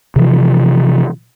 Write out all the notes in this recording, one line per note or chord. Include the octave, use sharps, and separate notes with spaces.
C3 E3 F3